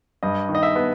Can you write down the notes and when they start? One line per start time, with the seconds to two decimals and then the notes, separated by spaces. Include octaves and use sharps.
0.23 G2 D#5
0.49 D#3
0.55 D#5
0.63 E5
0.76 B3